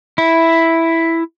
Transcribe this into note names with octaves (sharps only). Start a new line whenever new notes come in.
E4